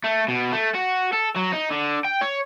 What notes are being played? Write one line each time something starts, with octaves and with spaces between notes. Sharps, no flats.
A3
B2
A3
F#4
A4
F#3
D#4
D3
G5
C#5